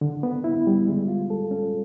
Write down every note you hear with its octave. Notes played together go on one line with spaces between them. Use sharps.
D3
B3
E4
G3
G#3
F4
A4
C#4